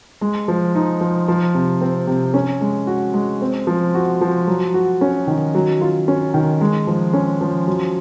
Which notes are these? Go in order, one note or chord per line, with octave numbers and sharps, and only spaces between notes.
G#3
F3
D#4
F3
F3
C3
C4
C3
C#4
G#3
F#4
G#3
C4
F3
F#4
F3
F#3
F#4
C#4
D#3
F#3
F4
C#4
D#3
G#3
F3
C#4
F3
F#3